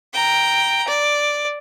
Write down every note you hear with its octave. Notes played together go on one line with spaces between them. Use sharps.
G5 A#5
D5